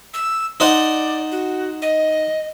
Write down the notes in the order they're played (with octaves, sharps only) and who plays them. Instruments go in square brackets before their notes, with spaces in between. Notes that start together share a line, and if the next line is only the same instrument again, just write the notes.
[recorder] E6
[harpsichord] D#4 C5 F#5 [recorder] D5
[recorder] F#4
D#5